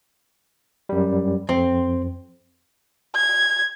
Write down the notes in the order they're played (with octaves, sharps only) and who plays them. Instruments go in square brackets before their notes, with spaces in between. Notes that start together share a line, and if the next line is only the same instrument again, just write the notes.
[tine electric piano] F#2 G3
[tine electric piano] F2 [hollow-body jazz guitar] C4
[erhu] G#6